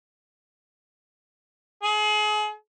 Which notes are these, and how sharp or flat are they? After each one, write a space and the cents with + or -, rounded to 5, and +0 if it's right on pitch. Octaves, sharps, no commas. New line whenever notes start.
G#4 +35